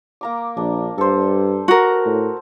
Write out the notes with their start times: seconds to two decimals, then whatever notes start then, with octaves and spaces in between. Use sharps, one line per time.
0.21 A#3 A#5 D6
0.57 A#1 D4
0.98 G2 A4 C5
1.68 F#4 A#4 A5
2.05 A2